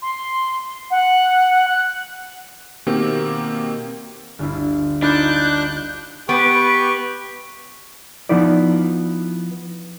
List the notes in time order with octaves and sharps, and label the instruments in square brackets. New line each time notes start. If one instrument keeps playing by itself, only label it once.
[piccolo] C6
F#5
F#6
[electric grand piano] B2 D#3 A#3 C4 G4
[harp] G1 D2 E4
[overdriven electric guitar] D4 [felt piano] D#4 [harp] F4 B5 [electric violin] F#6 G6
[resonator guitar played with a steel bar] B3 [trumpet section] G4 B4 [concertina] C#6 [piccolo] D7
[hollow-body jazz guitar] F3 B3 D#4 E4 D5